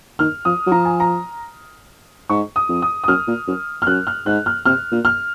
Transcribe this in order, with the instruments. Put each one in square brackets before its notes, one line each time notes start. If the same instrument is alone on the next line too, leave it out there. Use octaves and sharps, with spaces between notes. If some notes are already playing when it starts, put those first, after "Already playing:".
[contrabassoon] D#3 [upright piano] F6
[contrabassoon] F3 [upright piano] D#6
[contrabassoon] F#3
[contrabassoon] F3 [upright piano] A#5
[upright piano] G#5
A#5
[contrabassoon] G#2 [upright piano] C#6
[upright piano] D#6
[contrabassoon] F2
[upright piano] D#6
D#6
[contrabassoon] F#2 [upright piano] F6
[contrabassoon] A#2
F#2
[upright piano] F6
[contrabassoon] F#2 [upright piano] F#6
[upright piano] F6
[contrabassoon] G#2 [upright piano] F#6
[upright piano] F6
[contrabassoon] C3 [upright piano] F6
[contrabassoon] A#2
[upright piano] F6